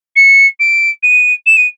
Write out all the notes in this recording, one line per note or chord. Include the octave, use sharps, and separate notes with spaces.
C#7
D7
D#7
E7
D#7